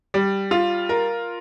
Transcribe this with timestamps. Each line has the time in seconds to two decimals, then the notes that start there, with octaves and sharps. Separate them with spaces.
0.14 G3
0.51 F4
0.89 A#4